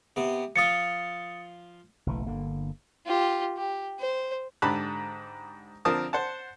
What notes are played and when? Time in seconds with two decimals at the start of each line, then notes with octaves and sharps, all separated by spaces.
0.16 C3 B3
0.56 F3 F4 D#6 A6 C#7
2.06 F#1 B1 E3 A3
2.26 G1 D3 A#3
3.06 F4 G4
3.57 G4
3.99 C5
4.62 G#2 D3 G4 A5 B5 F#6
5.85 D3 F3 C4 A#4 A5 D#6
6.13 C5 F#5 A5